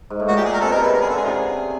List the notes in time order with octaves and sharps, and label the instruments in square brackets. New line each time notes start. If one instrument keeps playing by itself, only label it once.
[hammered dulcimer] G#2
A2
[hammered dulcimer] A#2 [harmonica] F#4
[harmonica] G4
G#4
A#4
[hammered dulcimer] C3 [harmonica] A4
[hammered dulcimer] B2 [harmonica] A#4
[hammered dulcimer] C3
[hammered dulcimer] C#3 [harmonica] B4
[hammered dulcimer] D3 [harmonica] A#4
[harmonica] G#4
[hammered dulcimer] D3 [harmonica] A4
[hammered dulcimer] C#3 [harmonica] G#4
[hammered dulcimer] C3 [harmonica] D#4 F4 G#4